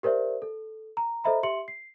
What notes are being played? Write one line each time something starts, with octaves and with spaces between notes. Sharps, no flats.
G4 A#4 C5 D5 E5
A4
A#5
A4 C5 D#5 E5 A#5 B5
G4 E5 C6 C#7 F#7
C7